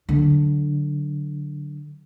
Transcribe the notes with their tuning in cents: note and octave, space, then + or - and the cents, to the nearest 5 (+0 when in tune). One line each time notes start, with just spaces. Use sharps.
D3 +0 F#3 +0